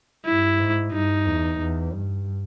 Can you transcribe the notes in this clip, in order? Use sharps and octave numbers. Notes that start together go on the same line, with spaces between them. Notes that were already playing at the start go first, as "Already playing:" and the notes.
G2 E4
G#2
G2 D#4
E2
E2
G2